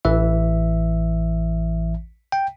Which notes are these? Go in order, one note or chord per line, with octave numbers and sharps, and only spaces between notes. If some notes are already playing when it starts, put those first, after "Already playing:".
A1 E3 E5
G5